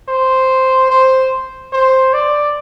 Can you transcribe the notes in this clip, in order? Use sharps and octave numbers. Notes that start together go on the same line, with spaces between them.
C5
C5
C5
D5